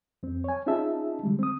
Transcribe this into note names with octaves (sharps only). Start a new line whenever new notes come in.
F2 C4
C#5 G#5
C#4 D#4 F4 G#4 E5 A5
D3 G3 G#3
C4 D#6